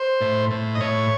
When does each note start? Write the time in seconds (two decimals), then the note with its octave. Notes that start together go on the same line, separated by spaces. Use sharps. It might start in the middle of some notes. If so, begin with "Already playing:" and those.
Already playing: C5
0.21 A2
0.51 A2
0.75 D#5
0.81 A2 C#5